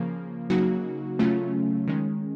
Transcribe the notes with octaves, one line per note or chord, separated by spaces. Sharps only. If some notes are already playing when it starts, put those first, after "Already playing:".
Already playing: C#3 F3 A#3
C#3 F#3 A#3 D#4 F#4
C#3 F#3 A3 C#4 F4
D#3 G#3 C#4